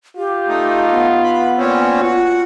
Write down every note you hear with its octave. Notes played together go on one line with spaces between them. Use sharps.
F4 G4
A3 D#4
B3
B5
A#2 C4 C#4
F4 F#4